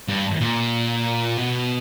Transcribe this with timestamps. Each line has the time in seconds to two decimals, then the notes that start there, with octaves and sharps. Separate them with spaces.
0.08 G2
0.41 A#2
1.38 B2